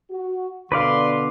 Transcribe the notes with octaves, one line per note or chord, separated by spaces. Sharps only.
F#4
B2 D3 B4 D5 F5 C6